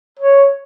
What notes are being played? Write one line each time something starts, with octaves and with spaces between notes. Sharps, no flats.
C#5